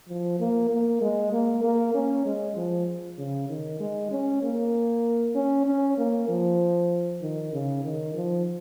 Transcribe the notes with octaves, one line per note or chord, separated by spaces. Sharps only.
F3
A#3
A#3
G#3
A#3
A#3
C#4
G#3
F3
C#3
D#3
G#3
C#4
A#3
C#4
C#4
A#3
F3
D#3
C#3
D#3
F3